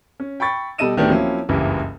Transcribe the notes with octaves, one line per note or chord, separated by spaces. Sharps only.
C#4
G5 B5 C#6 A6
B2 G3 A4 D#5 D#7 E7
D1 D#3 A3 B3 D4 G4
F3 F#3 A#3 C4 C#4 E4
F#1 C#2 G2 E3 G4